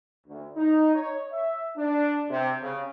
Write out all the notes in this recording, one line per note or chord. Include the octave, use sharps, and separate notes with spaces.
D2
D#4
C#5
E5
D4
C3
C#3